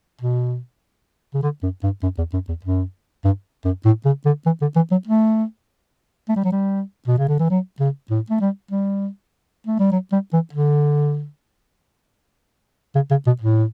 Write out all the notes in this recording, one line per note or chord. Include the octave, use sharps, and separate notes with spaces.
B2
C#3
D3
F#2
G2
F#2
E2
F#2
E2
F#2
G2
F#2
A2
C#3
D3
E3
D3
E3
F#3
A3
A3
G3
F#3
G3
B2
C#3
D3
E3
F#3
C#3
A2
A3
G3
G3
A3
G3
F#3
G3
E3
D3
C#3
C#3
B2
A2